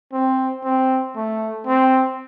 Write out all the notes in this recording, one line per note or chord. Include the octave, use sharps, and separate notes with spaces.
C4
C4
A3
C4